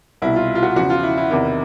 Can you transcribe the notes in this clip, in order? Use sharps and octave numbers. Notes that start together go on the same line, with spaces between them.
C2 B2 E4
F4
F4
F#4
E2 C#3 F3 F#4
F4
E4
E4
E2 C3 D#3 E4